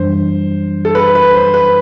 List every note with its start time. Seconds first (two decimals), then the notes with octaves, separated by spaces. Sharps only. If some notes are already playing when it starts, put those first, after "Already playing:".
Already playing: F#2 E3 G3 D4 C5
0.85 A4
0.95 B4
1.15 B4
1.34 C5
1.54 B4